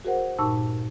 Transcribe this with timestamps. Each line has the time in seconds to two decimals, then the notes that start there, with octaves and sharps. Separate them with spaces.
0.05 F#4 G#4 A#4 C5 F#5
0.39 G2 A#2 D#4 A5 C#6 E6